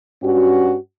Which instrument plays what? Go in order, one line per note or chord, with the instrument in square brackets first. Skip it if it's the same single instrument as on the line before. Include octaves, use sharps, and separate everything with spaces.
[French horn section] G2 C#4 F#4